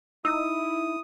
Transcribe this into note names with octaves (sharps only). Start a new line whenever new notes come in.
D#4 E4 D#6 E6